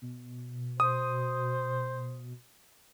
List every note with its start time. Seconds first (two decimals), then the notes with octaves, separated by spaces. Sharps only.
0.02 B2
0.80 C5 D#6